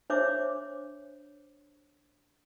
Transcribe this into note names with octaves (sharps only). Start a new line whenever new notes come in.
D4 C5 C#5 E5 D6